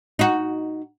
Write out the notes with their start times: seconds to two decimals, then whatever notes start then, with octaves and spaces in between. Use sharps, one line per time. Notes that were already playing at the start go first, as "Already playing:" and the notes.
0.19 D#4 F#4